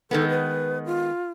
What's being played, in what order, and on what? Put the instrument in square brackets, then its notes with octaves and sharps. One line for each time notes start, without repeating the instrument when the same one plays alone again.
[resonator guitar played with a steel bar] D#3 G#3 B3 [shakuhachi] A4
[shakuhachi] B4
F4